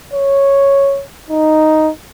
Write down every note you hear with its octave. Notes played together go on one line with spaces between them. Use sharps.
C#5
D#4